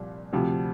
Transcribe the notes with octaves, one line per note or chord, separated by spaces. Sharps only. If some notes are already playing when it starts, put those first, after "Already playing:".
Already playing: C2 A#2 F3
D2 C3 F3